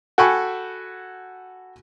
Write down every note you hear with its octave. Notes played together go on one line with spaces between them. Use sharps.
F#4 A4 G5 G#5 B5 C#6